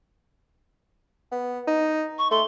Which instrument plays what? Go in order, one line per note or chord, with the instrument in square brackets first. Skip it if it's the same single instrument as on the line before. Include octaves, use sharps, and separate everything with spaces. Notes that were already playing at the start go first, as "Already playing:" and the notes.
[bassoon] B3
D#4
[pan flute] C#6
[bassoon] A3 [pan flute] C6